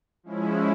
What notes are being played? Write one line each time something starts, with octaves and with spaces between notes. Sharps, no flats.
F3 G#3 C#4 E4